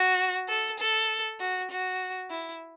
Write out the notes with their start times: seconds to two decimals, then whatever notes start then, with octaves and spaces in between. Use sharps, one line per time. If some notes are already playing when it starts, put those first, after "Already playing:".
Already playing: F#4
0.49 A4
0.80 A4
1.40 F#4
1.71 F#4
2.30 E4